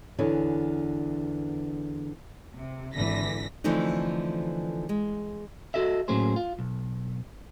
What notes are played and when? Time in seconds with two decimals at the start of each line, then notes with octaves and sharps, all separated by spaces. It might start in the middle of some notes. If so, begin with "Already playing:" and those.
0.19 E2 D3 B3 C#5 G#5
2.55 C3
2.94 G#1 D3 E3 A#6 B6
3.64 D3 E3 F3 A3 C4 D#4
4.89 G#3
5.74 F#4 A4 D#5 E5
6.08 A2 F#3 A#3 C#4 G#4 C5
6.36 F4
6.59 B1